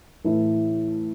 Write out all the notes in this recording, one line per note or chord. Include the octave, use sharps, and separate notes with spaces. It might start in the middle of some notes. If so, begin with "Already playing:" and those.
A2 E3 A3 E4